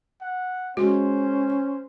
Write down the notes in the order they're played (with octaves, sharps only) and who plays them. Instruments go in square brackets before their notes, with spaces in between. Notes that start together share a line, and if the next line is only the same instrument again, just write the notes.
[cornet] F#5
[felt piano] G#3 [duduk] C#4 [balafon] F#4 [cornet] C5